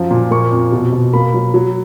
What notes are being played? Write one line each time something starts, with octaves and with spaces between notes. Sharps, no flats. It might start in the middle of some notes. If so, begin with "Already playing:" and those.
Already playing: F#2 F3
A#2
A#3 C#6
F2
B2
B2
A#3 B5
F#3
F#3